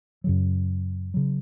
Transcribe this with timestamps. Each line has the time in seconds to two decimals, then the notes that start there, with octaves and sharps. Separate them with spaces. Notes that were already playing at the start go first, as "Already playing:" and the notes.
0.24 F#2 C#3 F#3
1.14 C#3 F#3